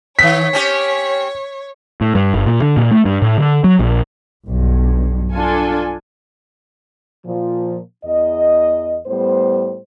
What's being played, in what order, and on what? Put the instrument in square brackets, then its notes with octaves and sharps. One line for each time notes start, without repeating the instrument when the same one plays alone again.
[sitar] D#3 B3 [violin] C#5 [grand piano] B6
[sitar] C4 C#4 G4
[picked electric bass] A2
G2
G1
A#2
D3
A#2
A3
G2
A2
D3
F#3
A#1
[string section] B1 G2
D4 F4 A4 G#5
[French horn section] A#2 F3
E2 D#5
A2 G3 B3 C5